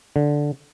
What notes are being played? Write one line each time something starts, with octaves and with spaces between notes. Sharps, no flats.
D3